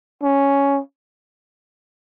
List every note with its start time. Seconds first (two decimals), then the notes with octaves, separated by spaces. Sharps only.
0.23 C#4